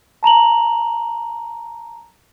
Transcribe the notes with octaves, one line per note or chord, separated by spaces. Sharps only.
A5 A#5 F7 F#7